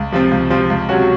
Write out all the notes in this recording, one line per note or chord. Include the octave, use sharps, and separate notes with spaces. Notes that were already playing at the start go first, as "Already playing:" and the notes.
Already playing: C#2
C3 F3 C4
C#2
C3 F3 C4
C#2
C3 F#3 C#4 F#4